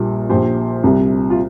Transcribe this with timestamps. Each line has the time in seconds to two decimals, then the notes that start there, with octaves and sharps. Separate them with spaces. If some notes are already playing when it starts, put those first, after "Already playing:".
Already playing: A#1 A#2 G3
0.29 A#1 A#2 F3 G4 C5
0.83 C2 C3 G3
1.30 F4